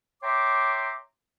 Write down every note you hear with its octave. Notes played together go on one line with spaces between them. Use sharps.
C#5 E5 G5 A#5 C6 D6